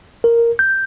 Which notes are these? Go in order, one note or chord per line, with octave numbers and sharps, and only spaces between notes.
A#4
G6